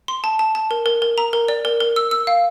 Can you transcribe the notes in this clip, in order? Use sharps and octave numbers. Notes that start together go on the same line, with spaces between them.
C6
A5
A5
A5
A#4
A#4
A#4
A#5
A#4
D5
A#4
A#4
E6
E6
F5